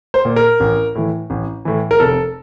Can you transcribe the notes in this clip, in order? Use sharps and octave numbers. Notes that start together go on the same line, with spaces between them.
C5
A#2
A#4
A1
A2 E3
A1
A2 E3
A#4
F1 A4